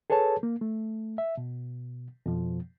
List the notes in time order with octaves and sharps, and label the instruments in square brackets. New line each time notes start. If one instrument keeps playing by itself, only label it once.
[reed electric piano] G#4 A4 B4 C#5 A5
A#3
A3
E5
B2
F2 B2 F3